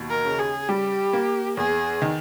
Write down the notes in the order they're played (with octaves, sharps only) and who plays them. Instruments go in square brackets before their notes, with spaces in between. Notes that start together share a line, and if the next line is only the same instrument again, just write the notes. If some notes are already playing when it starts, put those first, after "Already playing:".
Already playing: [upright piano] D#2 B2
[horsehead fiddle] A#4
[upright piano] C#3
[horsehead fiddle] G#4
[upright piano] G3 [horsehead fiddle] G4
[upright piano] A#3
[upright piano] E2 [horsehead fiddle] G#4
[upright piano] D#3